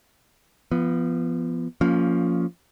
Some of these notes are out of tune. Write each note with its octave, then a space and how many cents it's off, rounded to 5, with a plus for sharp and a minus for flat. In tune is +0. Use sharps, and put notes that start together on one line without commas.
F3 -25 B3 +0
F3 +10 A#3 -10 C#4 +20